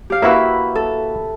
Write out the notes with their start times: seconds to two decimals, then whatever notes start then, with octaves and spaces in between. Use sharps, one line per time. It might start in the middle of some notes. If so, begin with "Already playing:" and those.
0.10 G4 F5
0.22 A#3 E4 F#4 B4 E5
0.75 A4